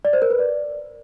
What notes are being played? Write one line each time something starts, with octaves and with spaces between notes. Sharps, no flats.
D5
C5
A#4
B4
D5